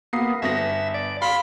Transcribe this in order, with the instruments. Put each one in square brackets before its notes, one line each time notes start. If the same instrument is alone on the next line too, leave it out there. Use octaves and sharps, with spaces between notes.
[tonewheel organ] A#3 B3 [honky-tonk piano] D#6 C7
[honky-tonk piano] G1 B3 A#6 [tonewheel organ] E5
[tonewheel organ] D5
[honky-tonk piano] F5 [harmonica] B5 [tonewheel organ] C6